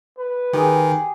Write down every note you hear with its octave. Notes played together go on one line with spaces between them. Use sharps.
B4
D#3 G4 G#4